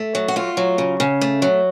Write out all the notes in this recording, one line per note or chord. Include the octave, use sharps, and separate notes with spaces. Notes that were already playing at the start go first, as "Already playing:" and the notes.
Already playing: A3
F#3
F#4
A3 F4
F#3
C#3
C#3
A3
F#3